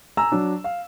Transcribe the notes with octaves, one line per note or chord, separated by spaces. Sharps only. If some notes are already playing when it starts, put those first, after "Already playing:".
G#5 A#5 E6
F#3 D4
F5